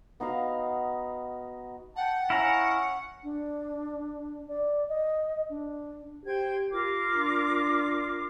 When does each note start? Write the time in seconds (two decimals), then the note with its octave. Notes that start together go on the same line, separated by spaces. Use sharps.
0.20 B3 D#4 F#4 F5
1.96 F#5 G5 A5
2.30 C#4 E4 F5 A#5
3.24 D4
4.48 D5
4.89 D#5
5.49 D4
6.26 G4 C5 G5 G#6
6.71 F4 A#4 D6
7.15 D4